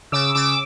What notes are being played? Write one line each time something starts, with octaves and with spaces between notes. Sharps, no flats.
C#3 D6 E6
C#3 D6 E6